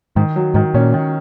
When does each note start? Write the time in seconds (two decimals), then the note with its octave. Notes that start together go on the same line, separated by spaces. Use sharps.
0.16 G#2 D#3
0.36 F#3
0.54 G#2 D#3
0.74 A#2 C#4
0.94 D#3